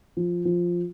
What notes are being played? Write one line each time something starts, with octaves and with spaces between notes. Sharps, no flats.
F3
F3